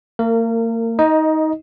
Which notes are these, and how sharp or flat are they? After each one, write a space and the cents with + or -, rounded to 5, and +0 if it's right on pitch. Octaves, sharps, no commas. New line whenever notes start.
A#3 -40 A#4 -25
D#4 +20 D#5 +0